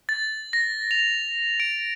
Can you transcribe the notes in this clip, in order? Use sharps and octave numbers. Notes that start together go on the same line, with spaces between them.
A6
A#6
F7
D7